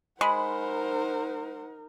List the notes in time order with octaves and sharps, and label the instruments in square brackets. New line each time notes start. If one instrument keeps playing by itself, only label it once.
[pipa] G#3 [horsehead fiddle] D#4 A#4 [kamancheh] C5 F#5 [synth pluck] B5